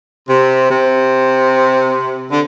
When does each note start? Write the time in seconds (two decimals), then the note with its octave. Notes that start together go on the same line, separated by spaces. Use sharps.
0.28 C3
0.70 C3
2.30 D3